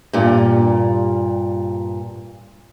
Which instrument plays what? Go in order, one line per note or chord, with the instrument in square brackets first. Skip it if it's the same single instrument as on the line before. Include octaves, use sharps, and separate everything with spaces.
[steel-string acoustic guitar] G2 A#2